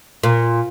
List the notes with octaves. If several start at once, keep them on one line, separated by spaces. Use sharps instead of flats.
A#2